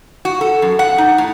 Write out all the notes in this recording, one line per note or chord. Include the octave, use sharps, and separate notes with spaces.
F#4
A4
F#2
F#5
D#4
A2